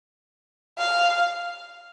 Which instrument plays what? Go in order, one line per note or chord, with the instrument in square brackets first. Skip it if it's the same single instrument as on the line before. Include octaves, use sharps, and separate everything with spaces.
[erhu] F5